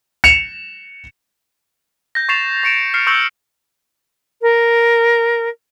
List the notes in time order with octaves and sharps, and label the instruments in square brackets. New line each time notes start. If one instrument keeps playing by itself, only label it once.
[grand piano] C#7 E7 F7
[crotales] G6 A#6
C#6 A6 C7 E7 F7
C#6 C#7 D7 E7
F6 C7 C#7
C#6 E6 G6 A#6 C#7 F#7
[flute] A#4